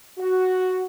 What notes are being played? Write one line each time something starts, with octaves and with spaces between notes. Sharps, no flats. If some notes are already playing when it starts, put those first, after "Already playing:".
F#4